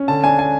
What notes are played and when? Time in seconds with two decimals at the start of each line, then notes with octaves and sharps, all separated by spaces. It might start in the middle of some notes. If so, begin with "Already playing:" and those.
Already playing: C#4
0.08 D3 A5
0.24 D4 G#5
0.39 G#5